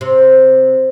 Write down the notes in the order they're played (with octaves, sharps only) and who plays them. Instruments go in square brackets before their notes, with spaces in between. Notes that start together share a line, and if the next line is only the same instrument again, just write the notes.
[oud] C3